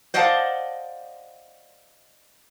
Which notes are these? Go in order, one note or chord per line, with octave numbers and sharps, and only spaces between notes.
C5 D5 D#5 F5 F#5 A5